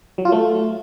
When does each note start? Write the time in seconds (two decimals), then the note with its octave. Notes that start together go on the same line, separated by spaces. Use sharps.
0.18 F#3
0.25 F4
0.32 A3